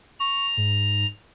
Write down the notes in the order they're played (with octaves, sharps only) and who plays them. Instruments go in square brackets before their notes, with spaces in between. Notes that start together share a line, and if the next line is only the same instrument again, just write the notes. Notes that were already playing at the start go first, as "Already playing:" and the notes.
[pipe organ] A#5 [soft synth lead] C#6
[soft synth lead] G#2